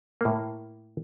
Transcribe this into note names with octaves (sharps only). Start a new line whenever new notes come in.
A2 A#3